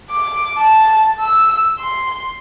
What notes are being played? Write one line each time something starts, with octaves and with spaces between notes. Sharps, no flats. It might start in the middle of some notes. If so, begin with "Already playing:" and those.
D6
A5
E6
C6